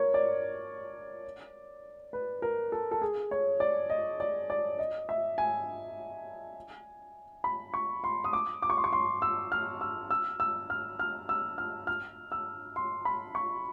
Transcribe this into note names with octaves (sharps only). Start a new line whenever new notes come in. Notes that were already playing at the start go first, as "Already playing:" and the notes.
Already playing: A#4 C#5
D5
B4
A#4
A4
A4
G#4
C#5
D5
D#5
D5
D5
D#5
E5
G#5
B5
C#6
C6
D#6
D6
D6
C#6
C6
C#6
C6
E6
F6
E6
E6
E6
F6
F6
E6
F6
F6
E6
C6
B5
C#6